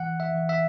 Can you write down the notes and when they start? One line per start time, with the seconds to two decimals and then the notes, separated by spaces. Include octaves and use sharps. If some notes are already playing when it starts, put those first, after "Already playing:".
Already playing: E3 F#5
0.20 E5
0.35 E3
0.49 E5